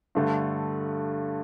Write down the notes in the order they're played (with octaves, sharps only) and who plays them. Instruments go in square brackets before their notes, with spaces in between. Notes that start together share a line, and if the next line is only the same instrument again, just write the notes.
[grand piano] G2 D3 A3